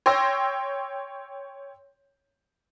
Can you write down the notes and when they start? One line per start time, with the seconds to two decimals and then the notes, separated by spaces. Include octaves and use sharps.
0.06 C#5 G5 C6 E6 A#6